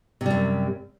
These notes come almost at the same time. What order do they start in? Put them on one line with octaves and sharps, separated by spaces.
C3 G3 F#2